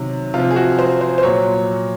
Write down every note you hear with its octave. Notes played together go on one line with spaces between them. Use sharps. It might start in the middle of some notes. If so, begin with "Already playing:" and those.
Already playing: C3 D#3 F#3
C3 F3 F4
G#4
F#4
C5
C5
C5
A#2 F#3 C#5